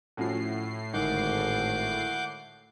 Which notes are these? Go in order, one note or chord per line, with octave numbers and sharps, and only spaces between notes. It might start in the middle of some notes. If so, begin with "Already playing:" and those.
A2 F3 C#4 F#4 C7
G#1 D2 G#2 D#3 F#5 D6 G6